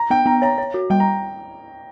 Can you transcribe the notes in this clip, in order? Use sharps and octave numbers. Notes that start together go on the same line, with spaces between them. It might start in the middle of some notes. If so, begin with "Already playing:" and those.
Already playing: A#5
B3 G5
B3 A#5
C#5 A#5
C#5
F#4
G3 G5
A#5